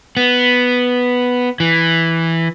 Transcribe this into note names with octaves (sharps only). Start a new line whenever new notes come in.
B3
E3